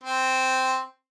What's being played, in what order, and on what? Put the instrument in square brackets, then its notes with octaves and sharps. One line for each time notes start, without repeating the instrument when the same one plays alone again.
[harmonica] C4